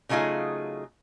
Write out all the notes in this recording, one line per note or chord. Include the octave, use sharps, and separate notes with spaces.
C#3 F#3 A3 D#4 F4 G#4